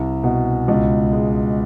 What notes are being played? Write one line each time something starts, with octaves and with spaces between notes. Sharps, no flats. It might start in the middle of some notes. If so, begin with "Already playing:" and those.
Already playing: C2
B2
C#2
G#3